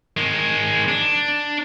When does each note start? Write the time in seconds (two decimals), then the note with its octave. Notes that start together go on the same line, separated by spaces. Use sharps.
0.17 D#3 G#3
0.89 D4